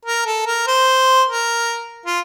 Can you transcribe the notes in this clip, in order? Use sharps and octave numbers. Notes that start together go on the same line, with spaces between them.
A#4
A4
A#4
C5
A#4
F4